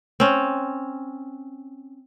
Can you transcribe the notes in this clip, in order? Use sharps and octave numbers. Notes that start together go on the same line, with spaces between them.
C4 C#4